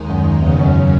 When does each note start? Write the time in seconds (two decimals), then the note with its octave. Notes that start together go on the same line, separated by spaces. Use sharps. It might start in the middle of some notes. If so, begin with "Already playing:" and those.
Already playing: D#2 D#3 G#3 D#4
0.10 F#2
0.42 E2 C#3 F#3 C#4
0.59 F#2